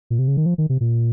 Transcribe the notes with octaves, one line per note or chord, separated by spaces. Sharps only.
A#2
C3
C#3
D#3
F3
D#3
C3
A#2